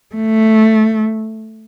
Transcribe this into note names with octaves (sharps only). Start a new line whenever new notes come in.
A3